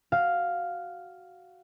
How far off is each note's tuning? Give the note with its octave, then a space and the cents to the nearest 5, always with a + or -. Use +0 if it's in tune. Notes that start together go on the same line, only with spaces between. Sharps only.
F#4 +10 F5 +0